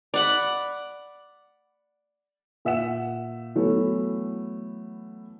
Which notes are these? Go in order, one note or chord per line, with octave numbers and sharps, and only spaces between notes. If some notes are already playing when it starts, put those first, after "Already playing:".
D5 F#5 B5
A#2 E5 F#5 E7
E3 F#3 A3 B3